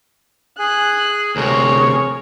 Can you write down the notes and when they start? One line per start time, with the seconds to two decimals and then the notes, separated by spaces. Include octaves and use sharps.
0.59 G#4 G#5 F#6
1.36 D2 C3 G#4 A#4 C#5